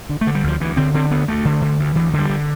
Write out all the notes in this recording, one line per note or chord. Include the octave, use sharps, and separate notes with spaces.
D3
A3
D3
G3
D2 F3
D2 E3
D3 C4
D3 C4
D2 B3
D2 A3
D3
D3
D2
D2 E3
D3
G3
D3